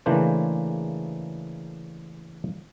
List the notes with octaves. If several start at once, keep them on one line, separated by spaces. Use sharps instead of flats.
C#3 E3 A3 A#3 D4 C5